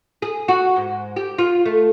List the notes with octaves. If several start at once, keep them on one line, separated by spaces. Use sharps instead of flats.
G#4
F#4
G#2
G4
F4
A3